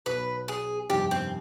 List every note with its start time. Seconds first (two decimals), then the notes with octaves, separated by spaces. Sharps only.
0.06 B1 B2 B3 B4
0.48 G#4
0.90 G1 F2 C3 D#3 G3 G4
1.11 C4